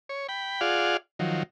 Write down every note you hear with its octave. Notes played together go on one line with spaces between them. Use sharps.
C#5
G5 B5
F4 G#4 D5 F5 F#5
D#3 F3 F#3